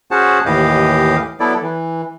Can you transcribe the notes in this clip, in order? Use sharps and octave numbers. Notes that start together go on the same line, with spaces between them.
C#4 F#4 G#4 C5 F#5 A5
D#2 A2 E3 G4 D#5 F5
F#3 B3 E4 A4 D5
E3